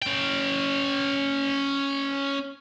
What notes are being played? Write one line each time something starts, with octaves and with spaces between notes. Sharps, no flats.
C#4 G5